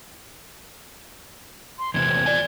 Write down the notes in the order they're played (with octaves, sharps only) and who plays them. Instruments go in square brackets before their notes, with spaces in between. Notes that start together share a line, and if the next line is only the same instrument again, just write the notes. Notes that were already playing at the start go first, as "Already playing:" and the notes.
[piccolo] C6
[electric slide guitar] E2 C3 C4 [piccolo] G#6
[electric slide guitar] D5 G#5